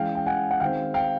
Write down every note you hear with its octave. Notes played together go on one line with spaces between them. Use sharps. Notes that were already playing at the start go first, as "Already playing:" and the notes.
Already playing: E3 G#3 C#4 F5 G5
G5
F#5 G#5
F#5
D#3 G#3 C4 F5 G5
F5 G5